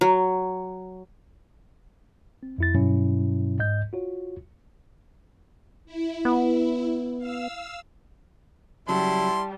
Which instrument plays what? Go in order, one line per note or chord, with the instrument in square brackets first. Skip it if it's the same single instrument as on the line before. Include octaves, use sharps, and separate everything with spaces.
[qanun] F#3
[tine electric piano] C4
F2 E4 A6
G2 B2 F#3 C#4 E4
G#2 D#5 G6
F4 F#4 C#5
[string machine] E4
[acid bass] B3
[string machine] F5 E6
[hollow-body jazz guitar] C#3 F#3 [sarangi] G3 [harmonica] E4 C6 [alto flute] A5